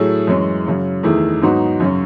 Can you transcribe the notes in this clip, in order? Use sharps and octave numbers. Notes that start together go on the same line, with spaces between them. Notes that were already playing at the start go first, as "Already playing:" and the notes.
Already playing: A2 F#3 A3 E4 G#4
F#2 E3 G#3 C#4
F#2 C#3 F#3
E2 D#3 A3 E4 G#4
G#2 F#3 B3 D#4 F#4
F#2 C#3 F#3 C#4